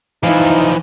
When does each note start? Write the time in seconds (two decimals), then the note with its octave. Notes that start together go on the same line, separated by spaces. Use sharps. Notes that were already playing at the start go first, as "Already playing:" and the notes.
0.23 E3 F3 D#4 E4 F5